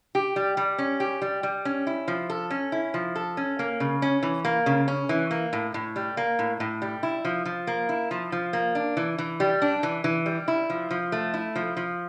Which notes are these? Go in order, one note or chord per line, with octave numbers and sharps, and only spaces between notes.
G4
G3
G3
C#4
G4
G3
G3
C#4
E4
F3
A4
C#4
E4
F3
A4
C#4
A#3
C#3
C#4
E3
A#3
C#3
C#4
E3
A#3
A2
A2
G3
A#3
A2
A2
G3
E4
F3
F3
A#3
E4
F3
F3
A#3
D4
E3
E3
G3
D4
E3
E3
G3
E4
F3
F3
A3
E4
F3
F3